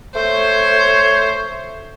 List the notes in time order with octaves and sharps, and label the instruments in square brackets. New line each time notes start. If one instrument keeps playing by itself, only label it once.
[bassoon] A3 [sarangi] C5 [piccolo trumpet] C#5